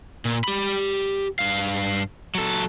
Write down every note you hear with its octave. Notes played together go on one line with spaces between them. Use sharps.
A#2
G4 B5
G2 F5
F#3 A4